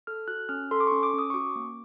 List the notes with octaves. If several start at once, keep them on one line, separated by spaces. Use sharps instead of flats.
A4 F6
F#4 F#6
C#4 F6
A4 C6
D6
C#4 C#6
D6
C#4 D#6
C#6
F#4 D6
A#3